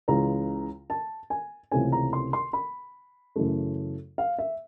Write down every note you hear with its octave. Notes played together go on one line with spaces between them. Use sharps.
C#2 C#3 E3 G#3 C#4 A#5
A5
G#5
C#2 C3 E3 A3 C#4 G#5
A#5
C6
C6
B5
F#2 C#3 E3 A3
F5
E5